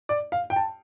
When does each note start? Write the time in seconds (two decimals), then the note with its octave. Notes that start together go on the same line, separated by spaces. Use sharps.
0.09 D5
0.32 F5
0.50 G5
0.56 A5